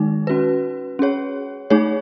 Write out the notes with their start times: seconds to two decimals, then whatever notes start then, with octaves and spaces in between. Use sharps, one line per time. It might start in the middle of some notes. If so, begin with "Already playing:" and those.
Already playing: D#3 G#3 D#4
0.27 C#4 F#4 B4
0.99 C#4 G#4 C#5
1.70 A3 D#4 G#4 C#5